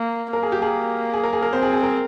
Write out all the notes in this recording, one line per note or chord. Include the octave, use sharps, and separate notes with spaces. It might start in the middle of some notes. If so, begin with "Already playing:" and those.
Already playing: A#3 A#4
A#3 A#4
G#4
G4
G#4
G#4
A#4
G#4
A#4
C4 C5
G#4
G#4
A#4